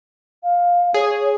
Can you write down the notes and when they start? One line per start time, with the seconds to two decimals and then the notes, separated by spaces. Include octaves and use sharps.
0.43 F5
0.94 G#4 C#5